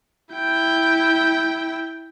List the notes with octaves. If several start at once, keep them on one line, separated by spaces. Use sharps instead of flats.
E4 G5